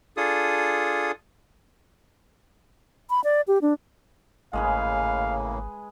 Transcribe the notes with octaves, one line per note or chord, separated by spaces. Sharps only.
D4 F4 G#4 A4 D#6
B5
D5
G4
D4
G#1 A2 C#3 G#3 A#3 G#4 B4 F5